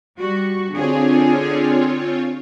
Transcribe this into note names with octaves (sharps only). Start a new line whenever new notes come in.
G3 F#4 C#6
D3 C4 F4 G#4 C#5